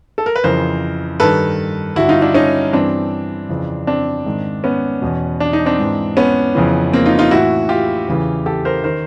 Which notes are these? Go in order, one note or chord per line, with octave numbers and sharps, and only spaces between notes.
A4
A#4
B4
F2 C#3 E3 A#4 C5
G2 D#3 A4 B4
G2 D3 E4 F#4
D#4 F4
D4 E4
C#4 D#4
G2 E3 C4 D4
F2 C#3 E3
C4 D4
G#2 D#3
B3 C#4
E2 B2
D4
D#4
C4 D4
G#2 E3
B3 C#4
F2 C#3 E3
A#3 C4
D#4 F4
D#4 F4
A2 E3 E4 F#4
F4 G4
E2 C#3 E3
G4 A4
A#4 C5
D#3 A#4 C5